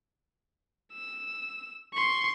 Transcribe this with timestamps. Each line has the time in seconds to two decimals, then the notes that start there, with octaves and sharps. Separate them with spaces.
0.93 E6
1.93 C6 C#6